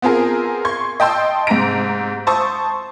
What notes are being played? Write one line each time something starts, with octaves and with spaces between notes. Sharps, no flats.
B3 C4 F4 G#4 A#4
C6 C#6 G#6
D#5 G5 A5 C6 E6
G#2 C3 A#5 A#6 D7
C5 A5 C#6 D#6 E6